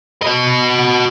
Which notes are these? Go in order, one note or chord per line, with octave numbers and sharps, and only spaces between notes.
F#4 D#5